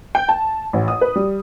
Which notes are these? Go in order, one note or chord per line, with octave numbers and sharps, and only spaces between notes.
G5
A5
A1
D#6
B4
G3